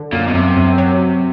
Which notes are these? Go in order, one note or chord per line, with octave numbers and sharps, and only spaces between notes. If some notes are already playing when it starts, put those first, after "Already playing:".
Already playing: D3
F#2 A#2
B2
F#2 C3
F#2
F#3